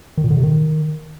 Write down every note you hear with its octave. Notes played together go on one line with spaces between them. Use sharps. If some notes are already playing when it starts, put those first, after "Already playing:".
D#3
A#2
D3
C3
D#3